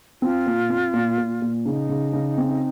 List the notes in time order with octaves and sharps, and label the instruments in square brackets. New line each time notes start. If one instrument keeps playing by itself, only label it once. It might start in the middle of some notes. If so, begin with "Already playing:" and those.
[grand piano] C4 [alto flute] F4
[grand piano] A#2
C4
A#2
A#2
A#2
[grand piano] C#3 [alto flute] D#4
[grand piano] C#3
C#3
C4